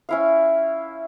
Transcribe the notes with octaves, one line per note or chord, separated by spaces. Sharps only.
C#4 E4 F5